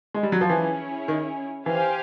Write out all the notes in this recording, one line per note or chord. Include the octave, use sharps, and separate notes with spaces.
G#3
G3
F#3
F3
E3 C#4 E4 G#4 C#5
D#3
E3 G4 C5 F5 G#5